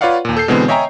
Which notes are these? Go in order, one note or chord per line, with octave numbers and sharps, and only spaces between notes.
F4 B4 C#5 D5 F5 F#5
D#2 A#2
A4 G6 C7
B2 D3 E3 G#3 B3 C4
C#5 D#5 E5 G5 G#5 A#5